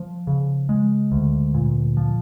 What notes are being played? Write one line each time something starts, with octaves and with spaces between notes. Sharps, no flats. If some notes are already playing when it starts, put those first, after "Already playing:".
Already playing: F3
C#3
G#3
D2
A#2
F3